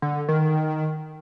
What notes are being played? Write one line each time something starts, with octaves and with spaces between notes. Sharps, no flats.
D3
D#3